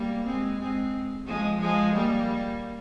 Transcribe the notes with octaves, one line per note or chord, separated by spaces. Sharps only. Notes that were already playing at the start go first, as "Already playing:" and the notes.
Already playing: G3 A#3
G#3 C4
G#3 C4
F3 G#3
F3 G#3
G3 A#3